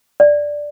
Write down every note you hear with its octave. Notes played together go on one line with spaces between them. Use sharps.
D5